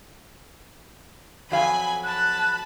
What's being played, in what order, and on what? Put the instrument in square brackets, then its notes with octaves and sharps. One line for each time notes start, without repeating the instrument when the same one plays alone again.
[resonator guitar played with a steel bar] F2 F#3 F5 [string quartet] G#5 B5
[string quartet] A5 B5 [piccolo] F#6